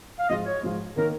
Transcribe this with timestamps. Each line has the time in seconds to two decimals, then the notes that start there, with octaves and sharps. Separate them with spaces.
0.19 F5
0.29 G#2 F3 G#3 F4 D#5
0.46 C#5
0.63 G#2 F3 G#3 F4
0.97 D#3 A#3 D#4 A#4 C#5